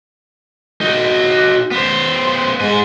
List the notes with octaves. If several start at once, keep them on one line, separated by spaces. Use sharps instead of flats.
D#4 F#4
B3 C5
G#2 G#4